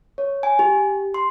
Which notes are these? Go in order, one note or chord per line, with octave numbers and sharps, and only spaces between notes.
C#5
G#5
G4
C6